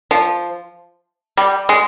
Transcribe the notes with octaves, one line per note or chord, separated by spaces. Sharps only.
F3
G3
G#3